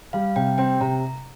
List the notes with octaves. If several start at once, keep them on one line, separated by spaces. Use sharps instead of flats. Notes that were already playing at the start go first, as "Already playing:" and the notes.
G3 F5
C3 G5
C4 G5
C3 A#5